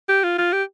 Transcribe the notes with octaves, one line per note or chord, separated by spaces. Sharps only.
G4
F4
F4
G4